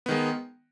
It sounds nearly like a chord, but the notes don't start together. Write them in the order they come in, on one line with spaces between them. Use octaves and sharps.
B3 D#3 G#3